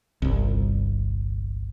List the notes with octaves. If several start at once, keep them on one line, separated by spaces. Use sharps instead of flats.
G1 C2